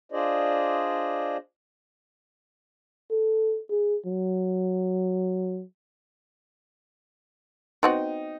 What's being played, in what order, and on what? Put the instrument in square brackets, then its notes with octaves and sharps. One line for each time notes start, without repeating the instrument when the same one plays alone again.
[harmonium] D4 F4 G#4 C5 D5 D#5
[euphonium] A4
G#4
F#3
[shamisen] B3 C4 F#4 [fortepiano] D#4